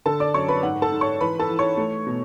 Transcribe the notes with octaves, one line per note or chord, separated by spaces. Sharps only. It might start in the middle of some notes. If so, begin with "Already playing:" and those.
D3 A4 A5
D5 D6
F#2 C#5 C#6
B4 B5
G#2 F#5
A4 A5
G#2
C#5 C#6
E3 B4 B5
A4 A5
E3
C#5 C#6
A3
B2